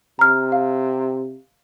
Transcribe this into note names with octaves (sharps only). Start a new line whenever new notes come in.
C3 A#5 F6
F5